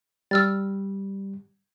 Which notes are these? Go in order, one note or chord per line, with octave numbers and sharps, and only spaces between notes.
G3 E6 F6 A6